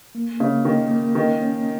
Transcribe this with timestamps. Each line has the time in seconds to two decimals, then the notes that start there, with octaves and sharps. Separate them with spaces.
0.15 A#3
0.40 C#3 A#3
0.65 D#3 A#3
0.91 A#3
1.15 D#3 C#4
1.41 C#4